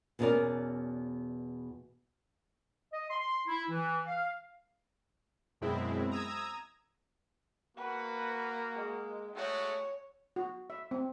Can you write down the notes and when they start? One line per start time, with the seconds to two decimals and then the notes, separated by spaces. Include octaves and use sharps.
0.19 E2 B2 C#4 E4 A#4 D5
2.93 D#5
3.10 C6
3.48 E4
3.70 E3
4.07 F5
5.61 F#2 B2 G#3 C4 E4
6.11 A#5 D#6 E6 G#6
7.77 A#3 F#4 B4
8.75 G#3
9.36 G#3 A3 F#4 C#5
10.36 F#4
10.70 E5
10.91 C4